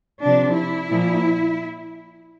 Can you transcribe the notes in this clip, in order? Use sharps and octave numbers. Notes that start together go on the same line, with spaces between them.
C3 F3 D4
E4
A#2 F3